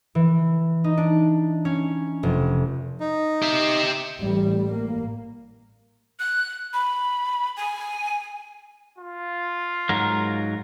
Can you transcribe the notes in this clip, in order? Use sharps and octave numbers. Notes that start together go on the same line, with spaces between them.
E3
D#4
D4
C#4
F1
D#4
G4 E5
A1 G3
A#3
F#6
B5
G#5
F4
G#2 F#3 A#4